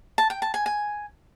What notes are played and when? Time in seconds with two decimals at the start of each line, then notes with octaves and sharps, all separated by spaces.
0.18 A5
0.30 G5
0.42 A5
0.54 G#5
0.66 G#5